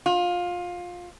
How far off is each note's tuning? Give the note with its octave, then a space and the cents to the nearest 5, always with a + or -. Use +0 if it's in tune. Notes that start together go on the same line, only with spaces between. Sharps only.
F4 +20